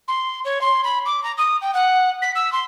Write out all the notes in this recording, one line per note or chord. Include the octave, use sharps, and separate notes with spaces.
C6
C#5
C6
B5
D6
A#5
D#6
G5
F#5
B6
E6
C6